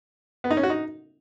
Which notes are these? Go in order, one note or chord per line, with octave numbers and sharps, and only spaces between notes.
B3
D#4
C#4
F#4
D#4